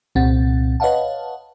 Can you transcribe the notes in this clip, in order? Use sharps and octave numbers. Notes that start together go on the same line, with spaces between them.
C2 A#2 C4 F#5 A6
B4 C#5 D#5 F5 F#5 A5